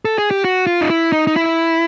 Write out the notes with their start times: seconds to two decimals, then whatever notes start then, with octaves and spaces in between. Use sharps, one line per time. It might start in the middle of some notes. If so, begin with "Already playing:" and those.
0.05 A4
0.18 G#4
0.31 G4
0.45 F#4
0.67 F4
0.81 D#4
0.90 E4
1.12 D#4
1.27 D#4
1.36 E4